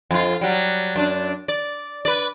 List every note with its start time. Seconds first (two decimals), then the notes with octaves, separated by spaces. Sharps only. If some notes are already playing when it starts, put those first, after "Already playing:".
0.11 F2 F4
0.41 F#3 G3
0.96 F#2 D4
1.48 D5
2.05 B4 D5